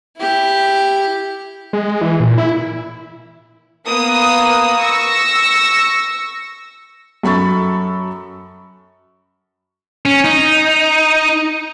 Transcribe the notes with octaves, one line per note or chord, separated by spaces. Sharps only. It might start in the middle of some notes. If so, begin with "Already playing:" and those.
E4 G4
G#3
E3
A#2
E4
A#3 B3 D#6
C#6 E6 A#6 C#7
F#2 A4 B5 C#6 A6
C#4
D#4